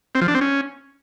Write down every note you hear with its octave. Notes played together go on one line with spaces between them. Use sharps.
C4
F3
D4
C4
C#4